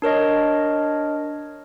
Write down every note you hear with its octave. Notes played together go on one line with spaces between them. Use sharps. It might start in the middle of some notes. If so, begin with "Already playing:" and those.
D4 A#4 C#5 D#5